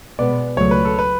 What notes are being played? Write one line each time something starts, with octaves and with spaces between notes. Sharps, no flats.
B2 G#3 B3 D5
C#2 C#3 F#3 A3 C#5
B4
A4
B4